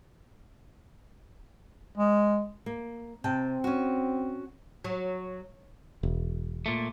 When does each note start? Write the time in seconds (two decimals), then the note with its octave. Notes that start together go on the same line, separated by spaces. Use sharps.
1.98 G#3
2.66 A#3
3.24 C3 C4 G5 A5
3.64 C#4 F#4
4.84 F#3
6.03 E1
6.66 A#2 A3